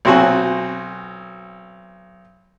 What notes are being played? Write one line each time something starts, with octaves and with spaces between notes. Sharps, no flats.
B1 C4 F#4 G#5